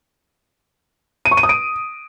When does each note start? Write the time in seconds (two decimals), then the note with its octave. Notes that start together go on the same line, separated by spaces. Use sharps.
1.25 D#7
1.31 C#6
1.37 D#7
1.43 D#6
1.49 D7